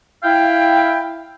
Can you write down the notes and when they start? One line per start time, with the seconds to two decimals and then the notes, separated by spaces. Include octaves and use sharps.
0.23 E4 F5 G5